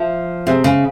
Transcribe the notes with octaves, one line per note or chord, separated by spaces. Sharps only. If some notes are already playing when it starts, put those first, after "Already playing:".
Already playing: F3 E5
C3 G#4 C5 E5
C#3